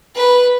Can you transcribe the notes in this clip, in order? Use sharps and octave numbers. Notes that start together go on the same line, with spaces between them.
B4